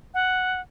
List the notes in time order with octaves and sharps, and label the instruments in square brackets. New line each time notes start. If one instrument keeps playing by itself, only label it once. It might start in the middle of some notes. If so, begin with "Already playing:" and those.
[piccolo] F#5